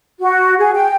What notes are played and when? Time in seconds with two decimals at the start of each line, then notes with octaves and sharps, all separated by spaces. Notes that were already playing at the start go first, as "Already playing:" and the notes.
0.21 F#4
0.59 G#4
0.75 G5